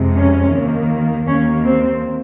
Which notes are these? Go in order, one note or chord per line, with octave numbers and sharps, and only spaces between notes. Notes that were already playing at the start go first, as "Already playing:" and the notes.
Already playing: F2 C3 F3 G#3
C#4
D#2 D#3 A#3
D#2 D#3 A#3 C#4
C4